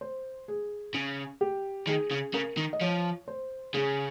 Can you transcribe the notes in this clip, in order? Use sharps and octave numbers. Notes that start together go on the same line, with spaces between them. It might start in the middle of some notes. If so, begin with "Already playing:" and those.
C5
G#4
C#3
G4
D#3 G#4
C#3
C#3 A#4
D#3
D#5
F3 C#5
C5
C#3 G#4